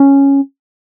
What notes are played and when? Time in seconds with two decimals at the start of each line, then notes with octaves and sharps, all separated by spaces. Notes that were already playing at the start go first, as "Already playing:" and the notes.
Already playing: C#4